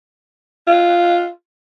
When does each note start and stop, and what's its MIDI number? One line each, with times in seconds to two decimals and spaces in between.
0.67 1.29 65